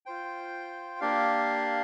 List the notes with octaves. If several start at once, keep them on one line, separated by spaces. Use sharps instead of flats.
F4 C5 G5
A#3 D4 G4 D5 F5